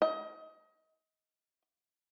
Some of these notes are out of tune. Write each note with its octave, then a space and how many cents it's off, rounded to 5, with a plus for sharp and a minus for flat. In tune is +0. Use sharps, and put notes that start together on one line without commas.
D#5 +30